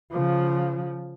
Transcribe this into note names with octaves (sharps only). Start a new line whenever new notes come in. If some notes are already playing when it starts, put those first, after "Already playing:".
C#3 F3